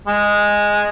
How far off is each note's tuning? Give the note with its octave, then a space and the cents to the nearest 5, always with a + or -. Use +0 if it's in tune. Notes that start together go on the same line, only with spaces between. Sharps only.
G#3 -5